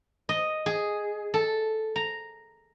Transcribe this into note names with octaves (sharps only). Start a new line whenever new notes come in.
D#5
G#4
A4
A#5